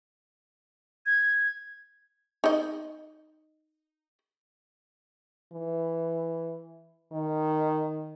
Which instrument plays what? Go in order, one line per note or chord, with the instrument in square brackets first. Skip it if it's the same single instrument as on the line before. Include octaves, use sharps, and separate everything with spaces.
[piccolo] G#6
[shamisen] D#4 D#5
[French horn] E3
D#3